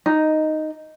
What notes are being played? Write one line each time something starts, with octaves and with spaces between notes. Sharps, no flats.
D#4